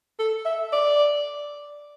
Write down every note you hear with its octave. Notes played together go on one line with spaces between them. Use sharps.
A4
E5
D5